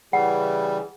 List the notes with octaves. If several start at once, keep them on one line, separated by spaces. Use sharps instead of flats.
C#3 E3 G3 G#4 F#5